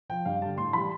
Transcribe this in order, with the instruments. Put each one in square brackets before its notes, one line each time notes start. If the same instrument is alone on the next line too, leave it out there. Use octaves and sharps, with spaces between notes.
[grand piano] F3 G5
G2 F5
D3 G3 A5
A2 C6
E3 G3 B5